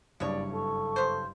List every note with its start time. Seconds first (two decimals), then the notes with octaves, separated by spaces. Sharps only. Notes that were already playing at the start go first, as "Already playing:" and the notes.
0.20 F#1 G2 B2 E3 C#5 D5
0.53 A4 C#6
0.96 B3 C5